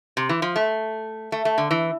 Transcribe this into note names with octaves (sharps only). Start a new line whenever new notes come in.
C3
E3
F3
A3
A3
A3
D3
E3